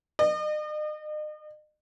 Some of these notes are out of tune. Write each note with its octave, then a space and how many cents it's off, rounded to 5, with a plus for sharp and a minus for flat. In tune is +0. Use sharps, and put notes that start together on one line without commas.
D#5 -40